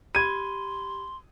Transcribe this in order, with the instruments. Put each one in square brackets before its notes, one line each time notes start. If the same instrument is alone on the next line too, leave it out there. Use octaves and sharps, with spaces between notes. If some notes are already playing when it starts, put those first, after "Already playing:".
[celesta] G4 B5 [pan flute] C6 [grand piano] G#6 D#7